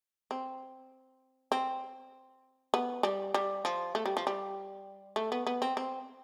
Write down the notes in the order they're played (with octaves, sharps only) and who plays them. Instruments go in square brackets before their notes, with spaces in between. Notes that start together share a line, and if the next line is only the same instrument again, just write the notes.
[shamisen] C4
C4
B3
G3
G3
F3
A3
G3
F3
G3
A3
B3
B3
C4
C4